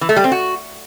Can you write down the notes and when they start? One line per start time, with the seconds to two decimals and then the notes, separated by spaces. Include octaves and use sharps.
0.01 E3
0.09 A3
0.16 G3
0.24 C4
0.32 F#4